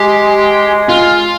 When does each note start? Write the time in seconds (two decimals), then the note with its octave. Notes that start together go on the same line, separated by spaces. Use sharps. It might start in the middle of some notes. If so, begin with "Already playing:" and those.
Already playing: G#3 G4
0.89 F4